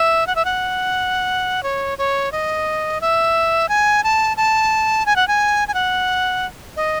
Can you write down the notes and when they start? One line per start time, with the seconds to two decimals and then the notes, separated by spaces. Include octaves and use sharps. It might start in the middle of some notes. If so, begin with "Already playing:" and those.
Already playing: E5
0.27 F#5
0.36 E5
0.45 F#5
1.63 C#5
1.98 C#5
2.32 D#5
3.01 E5
3.69 G#5
4.04 A5
4.37 A5
5.06 G#5
5.16 F#5
5.28 G#5
5.68 G#5
5.74 F#5
6.76 D#5